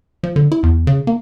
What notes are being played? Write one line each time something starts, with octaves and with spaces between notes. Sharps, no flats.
F3
D3
E4
E2
C#3
A#3